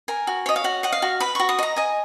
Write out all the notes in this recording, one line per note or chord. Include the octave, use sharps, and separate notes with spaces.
A#4 G#5
F#4
C#5 D#5
F5
F#4 F#5
D#5 F#5
F5
F#4
B4 B5
F#4 C#6
D#6
D#5 A#5
D#5 G#5